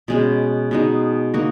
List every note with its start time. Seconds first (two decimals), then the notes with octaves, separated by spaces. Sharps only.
0.08 B2 G#3 C#4
0.71 B2 G#3 D#4
1.34 A#3 D#4 F#4